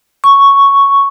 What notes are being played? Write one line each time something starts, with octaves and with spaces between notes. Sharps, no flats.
C#6